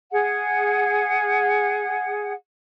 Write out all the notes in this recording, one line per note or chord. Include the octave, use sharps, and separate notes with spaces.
G#4 F#5